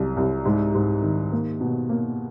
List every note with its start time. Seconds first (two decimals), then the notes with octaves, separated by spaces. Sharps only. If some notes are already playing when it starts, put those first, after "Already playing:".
Already playing: C2 F#3
0.17 C2
0.45 G#2
0.74 G#2
1.02 D#3
1.32 A#3
1.61 B2
1.89 A#3